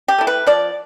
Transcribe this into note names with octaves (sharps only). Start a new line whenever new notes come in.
G4
A3 E4
B4
F3 D5